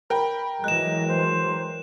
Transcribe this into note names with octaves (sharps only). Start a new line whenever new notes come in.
A#4 G5 B5
E3 F#3 G#3 D#5 F#6 E7
C5